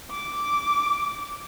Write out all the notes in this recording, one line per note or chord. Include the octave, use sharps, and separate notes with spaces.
D6